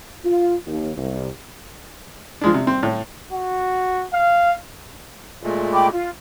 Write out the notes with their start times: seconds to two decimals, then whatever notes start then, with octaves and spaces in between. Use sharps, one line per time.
0.24 F4
0.67 D#2
0.96 C2
2.41 F3 G#3 D4
2.54 C3
2.67 C4
2.83 A2
3.32 F#4
4.14 F5
5.43 A#2 G#3 A3
5.72 G5 B5 D6
5.92 F4